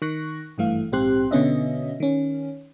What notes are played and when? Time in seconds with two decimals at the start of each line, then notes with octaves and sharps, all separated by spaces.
0.02 D#3 C#6 F#6 A#6
0.58 G#1 G2 E3 A3 F5
0.92 A#1 G#2 C4 G4 C6 F#6
1.31 B2 D3 B3 C#4 D#5 E5
2.00 D#3 C#4